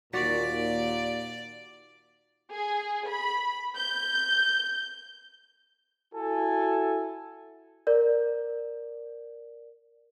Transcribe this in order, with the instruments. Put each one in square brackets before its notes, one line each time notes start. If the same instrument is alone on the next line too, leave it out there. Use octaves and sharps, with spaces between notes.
[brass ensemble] D#2 A#2 [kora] F#4 [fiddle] D5 [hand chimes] D6 A6 B6
[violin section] G#4
B5
G6
[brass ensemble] E4 F#4 G#5 [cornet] A4
[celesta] A#4 D5